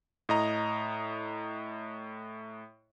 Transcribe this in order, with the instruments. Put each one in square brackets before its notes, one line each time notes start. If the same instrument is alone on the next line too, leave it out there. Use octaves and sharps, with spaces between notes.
[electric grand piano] A2 D#5 A#5